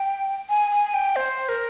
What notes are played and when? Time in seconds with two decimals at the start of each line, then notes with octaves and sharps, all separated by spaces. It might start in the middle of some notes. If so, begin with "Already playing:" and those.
Already playing: G5
0.50 G#5
0.71 G#5
0.94 G5
1.16 C5
1.49 A#4